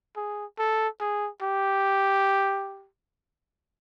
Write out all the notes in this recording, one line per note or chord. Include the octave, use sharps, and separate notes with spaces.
G#4
A4
G#4
G4